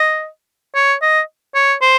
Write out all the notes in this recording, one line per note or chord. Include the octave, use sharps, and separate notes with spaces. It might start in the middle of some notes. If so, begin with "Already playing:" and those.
Already playing: D#5
C#5
D#5
C#5
C5